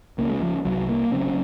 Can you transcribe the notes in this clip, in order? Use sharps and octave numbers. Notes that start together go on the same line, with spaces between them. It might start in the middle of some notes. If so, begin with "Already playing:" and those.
C#2 C#3 A#3
G#3
F3
C2 C3 F#3
A#3
F#1 F#2 C#3 C4